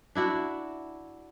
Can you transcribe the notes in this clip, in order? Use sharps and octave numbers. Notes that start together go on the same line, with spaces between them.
D4 E4 F#4